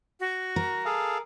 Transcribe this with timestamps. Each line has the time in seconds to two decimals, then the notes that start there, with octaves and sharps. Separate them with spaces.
0.20 F#4
0.56 A#4
0.85 G#4 A4 F5